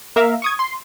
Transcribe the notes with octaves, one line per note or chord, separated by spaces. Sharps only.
A#3 A#4 E5 F5
C#6 D#6 G#6
C6